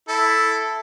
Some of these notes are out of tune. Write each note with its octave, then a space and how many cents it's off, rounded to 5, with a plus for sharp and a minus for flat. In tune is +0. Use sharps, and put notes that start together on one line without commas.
E4 +0 A4 +0